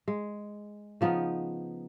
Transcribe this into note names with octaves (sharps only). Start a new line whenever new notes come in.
G#3
C#3 F3 B3 D#4